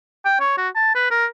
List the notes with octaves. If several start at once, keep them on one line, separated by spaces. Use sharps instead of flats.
G5
C#5
F#4
A5
B4
A#4